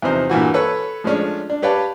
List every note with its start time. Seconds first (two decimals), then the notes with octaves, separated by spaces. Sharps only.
0.02 E2 C3 F3 D#4 C5
0.30 G2 A#2 E3 F#4
0.54 A4 B4 C#5
1.04 F3 G#3 A3 C#4 D4
1.50 D4
1.62 G4 B4 C#5 D5 F5 A5